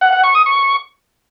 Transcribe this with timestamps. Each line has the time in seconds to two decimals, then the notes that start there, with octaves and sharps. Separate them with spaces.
0.01 F#5
0.12 F#5
0.24 C#6
0.35 D#6
0.46 C#6